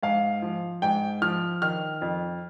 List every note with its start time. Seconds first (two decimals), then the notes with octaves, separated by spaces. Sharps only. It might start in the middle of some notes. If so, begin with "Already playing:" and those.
0.03 G#2 F5
0.42 F3
0.82 G#2 G5
1.22 F3 F6
1.62 D#3 F6
2.02 F2